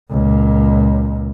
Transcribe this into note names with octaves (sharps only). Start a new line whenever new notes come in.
C#2 A#2